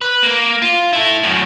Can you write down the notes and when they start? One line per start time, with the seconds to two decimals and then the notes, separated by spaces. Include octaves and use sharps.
0.01 B4
0.23 A#3
0.62 F4
0.93 E4 A4
1.23 F#2 A2